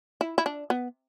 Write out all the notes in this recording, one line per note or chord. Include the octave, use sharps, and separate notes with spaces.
E4
E4
D4
B3